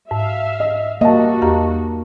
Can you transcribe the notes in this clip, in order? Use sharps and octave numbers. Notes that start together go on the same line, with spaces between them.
G#2 E5 F5
D#5
G3 A#3 F#4 D#5 A5
E2 G4 A#5